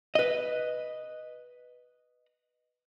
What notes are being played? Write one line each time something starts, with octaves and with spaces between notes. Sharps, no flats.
B4 D#5